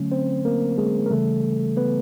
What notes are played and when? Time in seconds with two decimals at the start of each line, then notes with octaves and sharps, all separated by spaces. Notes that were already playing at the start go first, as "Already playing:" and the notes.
Already playing: D3 F#3 A3 C#4
0.12 C4 C5
0.45 A#3 A#4
0.78 G#3 G#4
1.06 A#4
1.10 C#3 E3 G3 A3 A4
1.77 B3 B4